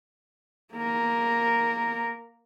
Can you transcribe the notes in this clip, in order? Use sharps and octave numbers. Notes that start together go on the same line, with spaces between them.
A#3 A#4